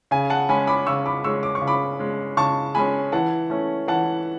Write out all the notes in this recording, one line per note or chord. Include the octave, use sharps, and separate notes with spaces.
C#3 G#5
F#5 A5
G#3 C#4 G#5 B5
B5 D6
C#3 C#6 E6
B5 D6
G#3 C#4 C#6 E6
D6
C#6
C#3
B5 D6
G#3 C#4
C#3 A5 C#6
G#3 C#4 G#5 B5
E3 F#5 A5
A3 C#4
E3 F#5 A5